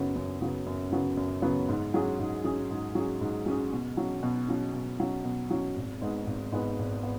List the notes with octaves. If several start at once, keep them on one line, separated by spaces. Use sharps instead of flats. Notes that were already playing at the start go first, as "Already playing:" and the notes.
Already playing: F#2 C#3 F#3 B3
F#2
C#3 F#3 B3
F#2
C#3 F#3 B3
F#2
C#3 F#3 B3
G#2
F#3 C#4 G#4
G#2
F#3 C#4 G#4
G#2
F#3 C#4 G#4
G#2
F#3 C#4 G#4
B2
F#3 C#4
B2
F#3 C#4
B2
F#3 C#4
B2
F#3 C#4
G#1
G#2 G#3 B3
G#1
G#2 G#3 B3
G#1
B3